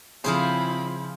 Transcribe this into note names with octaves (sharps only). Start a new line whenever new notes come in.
C#3 F3 C4 E4 F4 G#4 C5 B5